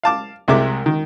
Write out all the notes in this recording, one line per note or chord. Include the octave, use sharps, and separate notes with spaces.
F5 A5 D6
C2 C3 G#3 E5 D6
D#3